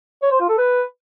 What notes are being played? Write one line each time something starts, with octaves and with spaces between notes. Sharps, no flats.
C#5
C5
F4
A4
B4